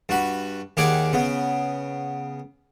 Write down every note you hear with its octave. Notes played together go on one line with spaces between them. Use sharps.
G2 F#4 B5
D#2 G4 G#4 D5 F#5
C#3 B3